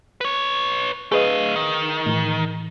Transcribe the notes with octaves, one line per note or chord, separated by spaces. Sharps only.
B4 C#5
A3 G#4 B4 D#5 F5
D#3
A2 E3